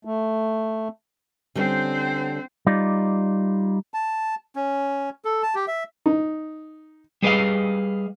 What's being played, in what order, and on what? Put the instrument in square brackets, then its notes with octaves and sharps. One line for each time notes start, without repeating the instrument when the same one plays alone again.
[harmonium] A3
[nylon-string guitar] D3 G3 C#4 [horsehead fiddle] C4 C5
[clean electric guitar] G3 D#4 F4 D5
[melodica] A5
C#4
A4
A5
G4
E5
[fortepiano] D#4
[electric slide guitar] G3 G#4 B4 D5 D#5 F5